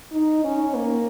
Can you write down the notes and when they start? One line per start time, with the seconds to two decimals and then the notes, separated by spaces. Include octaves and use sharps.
0.13 D#4
0.44 C#4
0.75 A#3